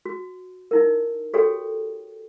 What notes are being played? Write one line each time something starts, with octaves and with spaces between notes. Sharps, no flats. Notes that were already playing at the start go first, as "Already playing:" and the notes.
F#4
D#4 E4 A#4
F#4 G4 A4 C#5 G5